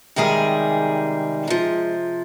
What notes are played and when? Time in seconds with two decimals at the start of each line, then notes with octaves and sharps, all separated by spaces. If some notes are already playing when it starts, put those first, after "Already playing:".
0.16 C3 D#3 G3 G#3 G#4
1.48 C3 F3